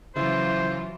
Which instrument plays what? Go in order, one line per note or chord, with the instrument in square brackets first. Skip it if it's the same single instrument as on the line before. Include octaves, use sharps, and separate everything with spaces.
[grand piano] C#3 E4 [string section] E3 F#3 F4 [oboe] C5